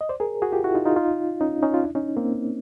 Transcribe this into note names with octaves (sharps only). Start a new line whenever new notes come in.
D#5
C5 D5
G#4 A#4
F#4 G#4
F4 G4
E4 F#4
D#4 F4
D#4 F4
D#4 F4
C#4 D#4
C#4 D#4
F4
D4 E4
C#4 D#4
A#3 C4